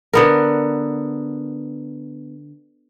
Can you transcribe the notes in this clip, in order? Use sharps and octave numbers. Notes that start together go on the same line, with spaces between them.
D3 B3 A#4